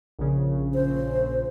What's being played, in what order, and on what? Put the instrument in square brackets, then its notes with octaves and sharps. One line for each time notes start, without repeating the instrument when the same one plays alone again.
[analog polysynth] A#1 C#3
[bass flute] C5